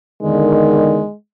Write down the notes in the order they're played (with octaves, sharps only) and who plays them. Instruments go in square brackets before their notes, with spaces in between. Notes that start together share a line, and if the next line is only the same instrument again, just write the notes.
[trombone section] E2 D3 D#3 [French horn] G#3